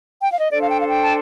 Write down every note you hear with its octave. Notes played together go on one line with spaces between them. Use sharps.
G5
F5
D#5
D4 A4 C5 D5
F5
G5
F5
G5
A5